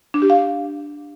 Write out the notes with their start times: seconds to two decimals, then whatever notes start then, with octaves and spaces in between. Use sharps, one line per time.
0.14 D4
0.22 G4
0.30 F5